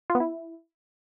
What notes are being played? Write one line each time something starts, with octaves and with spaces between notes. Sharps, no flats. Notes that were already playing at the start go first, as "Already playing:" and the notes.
F4
B3
E4